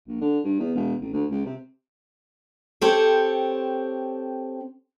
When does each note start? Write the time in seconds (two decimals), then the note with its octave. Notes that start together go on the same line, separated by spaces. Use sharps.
0.07 A#1
0.21 D3
0.44 G2
0.59 E2
0.75 E1
1.01 A1
1.13 D2
1.31 C#2
1.46 C3
2.81 C4 G4 A4 C5 C#5